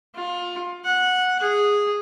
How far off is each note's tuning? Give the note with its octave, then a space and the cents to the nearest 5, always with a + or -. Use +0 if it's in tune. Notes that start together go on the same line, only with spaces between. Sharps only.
F4 +20
F#5 -10
G#4 -10